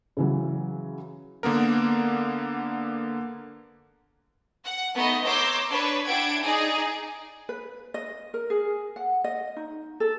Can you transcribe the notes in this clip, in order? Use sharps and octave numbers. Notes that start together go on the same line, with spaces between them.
C#3 E3 F#3
D3 A#3 B3 A#4
F#5
A3 B3 D#4 D#5
C#5 A#5 C6 D6 E6 G6
D4 B4 C#5
D4 E4 F#5 G5 G#6 D7
D#4 G#4 D5
B4
D#5
A#4
G#4
F#5
D#5
D#4
A4